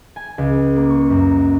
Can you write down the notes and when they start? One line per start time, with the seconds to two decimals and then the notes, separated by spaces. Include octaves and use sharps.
0.16 G#5
0.38 C#2
0.75 A#3
0.90 C#6
1.10 F#2